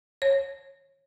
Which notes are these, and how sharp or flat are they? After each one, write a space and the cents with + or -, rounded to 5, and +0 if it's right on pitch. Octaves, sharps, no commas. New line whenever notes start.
C#5 -20